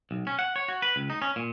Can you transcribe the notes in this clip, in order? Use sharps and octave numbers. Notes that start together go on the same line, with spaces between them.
B1
C#4
F#5
C#5
F#4
B4
C#2
D#4
C#4
A#2